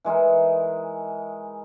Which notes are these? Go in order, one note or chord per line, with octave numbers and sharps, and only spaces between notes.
E3 G#3 D#4 A#4